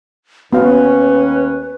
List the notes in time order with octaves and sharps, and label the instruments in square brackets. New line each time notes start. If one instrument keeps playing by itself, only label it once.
[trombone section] D#2 C#4 [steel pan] B3 F#4 F5 [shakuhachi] B4